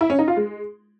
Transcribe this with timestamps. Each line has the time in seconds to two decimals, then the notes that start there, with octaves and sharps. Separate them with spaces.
0.01 E4
0.10 C#4
0.19 D#4
0.28 F4
0.37 G#3